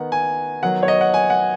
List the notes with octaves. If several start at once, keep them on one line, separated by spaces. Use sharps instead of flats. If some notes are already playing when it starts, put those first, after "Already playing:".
Already playing: D#3 B3 F#5
G#5
D#3 F#3 B3 F#5
C#5
D#5
F#5
G#5
F#5